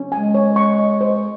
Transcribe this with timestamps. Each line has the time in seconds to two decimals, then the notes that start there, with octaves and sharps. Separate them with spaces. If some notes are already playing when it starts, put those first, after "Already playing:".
Already playing: C#4
0.12 G#3 G#5
0.35 C#5
0.56 C#6
0.78 D#5
1.01 C5